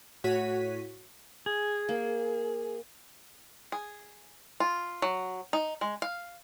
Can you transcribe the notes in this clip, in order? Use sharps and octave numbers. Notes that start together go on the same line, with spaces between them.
A2 F#4 C#5 B6 D#7
G#4
A#3
G#4
F4
F#3
D#4
G#3
F5